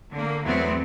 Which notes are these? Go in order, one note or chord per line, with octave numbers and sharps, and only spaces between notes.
D3 A#3
E2 F#3 A3 B3 C4